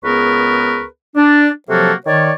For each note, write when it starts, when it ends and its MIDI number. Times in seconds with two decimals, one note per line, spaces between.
0.04 0.84 37
0.04 0.84 59
0.04 0.84 68
0.04 0.84 70
0.04 0.84 71
0.04 0.84 85
1.15 1.48 62
1.69 1.93 48
1.69 1.93 53
1.69 1.93 54
1.69 1.93 58
1.69 1.93 66
1.69 1.93 69
2.06 2.32 51
2.06 2.32 73
2.06 2.32 74